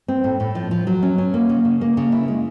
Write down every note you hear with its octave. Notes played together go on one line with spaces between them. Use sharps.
C4
A2
A2
F3
F3
F#3
C#4
C#4
A#3
C#3
C#3
A#3
C#3
E4
G#3